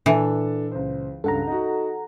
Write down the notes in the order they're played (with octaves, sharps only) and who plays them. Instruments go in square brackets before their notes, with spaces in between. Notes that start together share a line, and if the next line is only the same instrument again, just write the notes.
[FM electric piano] A#2 [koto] E3 [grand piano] D4 A4
[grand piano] C#2 C5
[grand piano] C#2 G2 [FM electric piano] A4 F#5 A#5
[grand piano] D#4 F#4